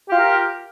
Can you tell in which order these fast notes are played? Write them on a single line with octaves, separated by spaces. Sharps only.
G4 F4 A#4